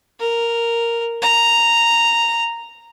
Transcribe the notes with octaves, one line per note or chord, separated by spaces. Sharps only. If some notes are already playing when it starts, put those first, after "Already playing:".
A#4
A#5